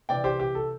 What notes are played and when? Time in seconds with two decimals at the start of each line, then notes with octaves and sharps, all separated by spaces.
0.09 C3 E3 C4 D5 G5
0.24 G4 C5
0.40 G4
0.55 A4